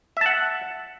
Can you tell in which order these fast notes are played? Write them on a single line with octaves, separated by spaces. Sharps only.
E5 A5 F#5